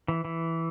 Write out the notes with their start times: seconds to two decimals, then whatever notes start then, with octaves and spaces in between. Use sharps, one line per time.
0.08 E3
0.25 E3